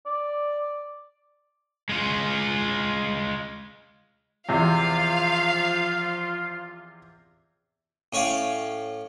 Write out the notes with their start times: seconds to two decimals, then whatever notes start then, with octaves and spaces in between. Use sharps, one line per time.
0.06 D5
1.89 G#3 F4
4.49 E2 C3 F3 F4 F5
8.13 A2 C#4 C#5 D5 F5